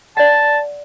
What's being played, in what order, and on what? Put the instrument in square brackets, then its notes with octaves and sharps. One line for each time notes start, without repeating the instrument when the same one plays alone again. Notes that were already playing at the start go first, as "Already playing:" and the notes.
[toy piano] D5 F#5 [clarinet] A5